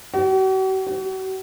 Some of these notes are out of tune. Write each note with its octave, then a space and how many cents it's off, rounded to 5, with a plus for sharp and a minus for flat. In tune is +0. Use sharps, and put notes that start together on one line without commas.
F#4 +45
F#4 +40